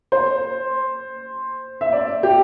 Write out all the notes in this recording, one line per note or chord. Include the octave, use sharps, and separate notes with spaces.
C5
E5
D5
G4